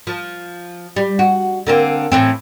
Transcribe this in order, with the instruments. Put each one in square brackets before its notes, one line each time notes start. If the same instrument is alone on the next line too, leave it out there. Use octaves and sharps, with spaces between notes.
[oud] F3
G3
F#4
D3 A#3 C4
A2 E3 C4